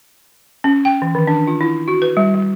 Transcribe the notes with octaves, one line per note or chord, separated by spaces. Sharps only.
C#4
G5
E3
D#3
D4
F4
E4
F#4
B4
G3
G3